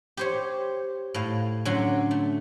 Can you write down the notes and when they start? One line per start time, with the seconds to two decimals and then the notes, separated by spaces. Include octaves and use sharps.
0.17 G4 C5 C#5
1.14 A2 F5
1.65 D3 F#3 C#4 F#5 C6
2.11 A3